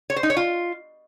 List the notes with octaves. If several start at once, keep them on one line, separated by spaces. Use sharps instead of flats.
C#5
C5
D#4
C#5
F4